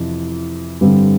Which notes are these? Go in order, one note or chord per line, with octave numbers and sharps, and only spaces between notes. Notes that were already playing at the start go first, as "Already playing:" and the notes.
Already playing: F2 C3 E3
G2 D3 G3 C4